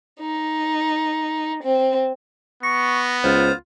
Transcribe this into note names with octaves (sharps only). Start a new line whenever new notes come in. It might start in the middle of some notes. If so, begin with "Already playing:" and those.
D#4
C4
B3 C#6 A#6
C#2 F4 C5